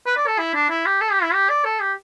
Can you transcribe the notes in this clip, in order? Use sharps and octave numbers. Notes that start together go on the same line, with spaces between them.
B4
D5
A4
E4
D4
E4
G4
A4
G4
E4
G4
D5
A4
G4